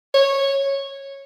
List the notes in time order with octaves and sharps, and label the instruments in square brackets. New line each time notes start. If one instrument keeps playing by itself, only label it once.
[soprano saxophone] C#5